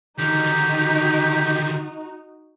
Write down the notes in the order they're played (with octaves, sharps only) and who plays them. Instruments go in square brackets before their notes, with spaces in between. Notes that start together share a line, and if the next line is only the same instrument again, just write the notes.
[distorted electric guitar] D3 D#3 [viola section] D#4 F#4 [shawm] G4